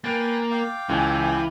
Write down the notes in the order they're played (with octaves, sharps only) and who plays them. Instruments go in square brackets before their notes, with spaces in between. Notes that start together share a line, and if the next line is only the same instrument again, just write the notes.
[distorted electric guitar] A#3 [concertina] B4 G5 G#5 [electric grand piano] A6
[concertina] F5 G5 D6
[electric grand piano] C#2 G#5 [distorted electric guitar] E3